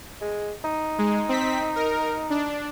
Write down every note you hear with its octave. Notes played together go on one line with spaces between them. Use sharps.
G#3
D#4
G#3
C4 B6
A#4
D4